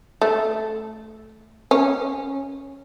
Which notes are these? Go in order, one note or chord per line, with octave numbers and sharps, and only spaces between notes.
A3
C#4